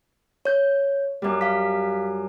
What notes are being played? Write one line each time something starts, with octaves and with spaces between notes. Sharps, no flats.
C#5 G6
F#2 G3
F5 B6